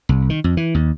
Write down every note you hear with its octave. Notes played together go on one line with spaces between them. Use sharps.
C2
D#3
F2
E3
D#2